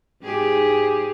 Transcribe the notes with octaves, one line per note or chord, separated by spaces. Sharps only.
G#2 G4 G#4